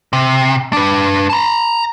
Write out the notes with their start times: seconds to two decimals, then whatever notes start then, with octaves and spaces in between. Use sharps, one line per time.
0.13 C3
0.73 D4 B4
1.30 A5 A#5